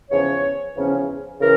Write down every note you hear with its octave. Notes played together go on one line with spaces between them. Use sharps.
E2 C#3 F3 C#4 C#5
E2 C#3 F3 C#4
C#3 E3 A#4